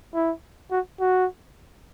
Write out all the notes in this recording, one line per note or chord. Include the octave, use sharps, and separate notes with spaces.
E4
F#4
F#4